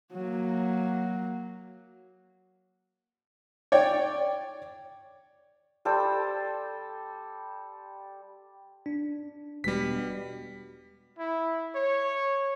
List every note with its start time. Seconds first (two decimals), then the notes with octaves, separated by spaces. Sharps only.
0.13 F#3 A#3
3.72 C#5 D5 G5
5.85 G3 A4 C5 G5
8.86 D4
9.64 E1 B2 G3 G#3 B6
11.19 E4
11.75 C#5